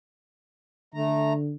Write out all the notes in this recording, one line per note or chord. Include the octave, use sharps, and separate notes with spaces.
D3 A3 A#5